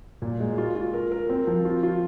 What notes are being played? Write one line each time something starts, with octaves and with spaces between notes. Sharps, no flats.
A#2
G#3
F4
F4
A#4
A#4
C4
F3
F4
F4